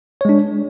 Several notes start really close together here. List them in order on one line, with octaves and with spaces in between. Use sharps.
C#5 G#3 D4